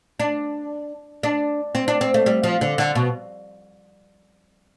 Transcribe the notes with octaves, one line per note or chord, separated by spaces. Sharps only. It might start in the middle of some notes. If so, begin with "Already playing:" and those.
D4
D4
C4
D4
C4
A3
G3
F3
D3
D3
B2